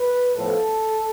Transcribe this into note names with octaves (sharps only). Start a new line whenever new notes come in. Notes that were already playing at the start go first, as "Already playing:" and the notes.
Already playing: B4
A2 F3 B3 A4